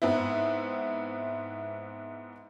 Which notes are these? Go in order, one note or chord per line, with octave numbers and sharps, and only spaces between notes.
G#2 B3 C4 E4